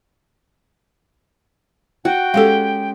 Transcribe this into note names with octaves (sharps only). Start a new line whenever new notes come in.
F#4 G5
G#3 C#4 G4 A4 F5